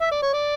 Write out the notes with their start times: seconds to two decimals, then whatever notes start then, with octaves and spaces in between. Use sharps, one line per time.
0.01 E5
0.11 D5
0.23 C#5
0.33 D5